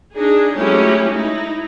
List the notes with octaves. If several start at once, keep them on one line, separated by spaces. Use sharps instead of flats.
D4 D#4 G#4
F#3 G#3 A3 C#4 E4 G4
D#4 E4